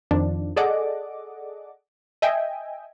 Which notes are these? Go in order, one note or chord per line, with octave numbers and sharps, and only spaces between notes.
F2 D#3 F3 D4
G#4 A4 D5 D#5 F#5 D6
D#5 E5 G5 G#5